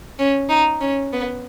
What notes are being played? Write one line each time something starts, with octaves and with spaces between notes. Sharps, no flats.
C#4
D#4
C#4
B3